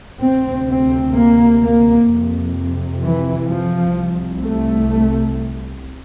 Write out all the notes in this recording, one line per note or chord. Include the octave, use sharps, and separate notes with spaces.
D2 C3 C4
C4
A#3
A#3
F2 C3
E3
F3
C2 C3
A3